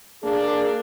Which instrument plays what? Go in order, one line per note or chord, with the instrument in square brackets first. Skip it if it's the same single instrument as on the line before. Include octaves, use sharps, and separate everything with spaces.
[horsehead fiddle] A#3 [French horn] D4 [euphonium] G#4